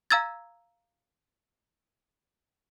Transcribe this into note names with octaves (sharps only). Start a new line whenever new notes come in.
F5 A#5 E6 G#6 A6